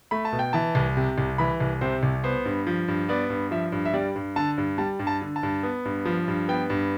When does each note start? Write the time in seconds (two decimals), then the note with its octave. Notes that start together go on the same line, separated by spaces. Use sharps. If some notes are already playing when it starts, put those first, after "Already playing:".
0.11 A3 B5
0.25 A5
0.32 B2
0.39 G5
0.53 E3 A5
0.75 C2
0.97 C3
1.18 C2
1.38 E3 B5
1.60 C2
1.81 C3 C5
2.03 C2
2.24 B3 C5
2.45 G2
2.67 F3
2.88 G2
3.09 B3 D5
3.30 G2
3.51 F3 E5
3.72 G2
3.85 E5
3.94 G3 D5
4.15 G2
4.36 D3 A5
4.58 G2
4.78 G3 A5
4.99 G2
5.07 A5
5.22 D3
5.36 A5
5.43 G2
5.63 B3
5.85 G2
6.05 F3
6.28 G2
6.48 B3 G5
6.70 G2